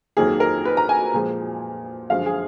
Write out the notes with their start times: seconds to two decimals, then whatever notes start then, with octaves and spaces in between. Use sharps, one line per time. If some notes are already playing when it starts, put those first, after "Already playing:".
0.17 F2 D#3 F#3 A#3 G#4
0.40 A#4
0.65 B4
0.77 A#5
0.89 G#5
1.14 A#2 F3 G#3
2.10 F#2 D3 F3 G#3 F5
2.26 G#4